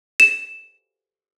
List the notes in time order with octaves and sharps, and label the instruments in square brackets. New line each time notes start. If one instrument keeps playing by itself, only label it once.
[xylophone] E7